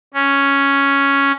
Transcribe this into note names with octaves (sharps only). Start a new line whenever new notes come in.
C#4